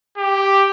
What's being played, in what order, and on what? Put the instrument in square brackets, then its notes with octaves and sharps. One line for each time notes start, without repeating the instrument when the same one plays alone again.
[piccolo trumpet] G4